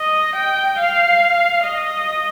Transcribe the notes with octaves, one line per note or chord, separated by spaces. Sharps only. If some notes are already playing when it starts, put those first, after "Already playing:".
Already playing: D#5
G5
F5
D#5